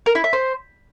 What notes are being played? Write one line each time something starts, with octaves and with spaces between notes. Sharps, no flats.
A#4
E4
E5
C5